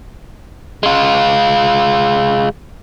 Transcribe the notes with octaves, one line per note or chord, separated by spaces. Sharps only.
G#3 F4